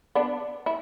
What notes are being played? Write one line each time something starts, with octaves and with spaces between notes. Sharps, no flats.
B3 D4
E4